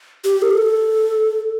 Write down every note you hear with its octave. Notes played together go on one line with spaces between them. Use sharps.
G4
A#4
A4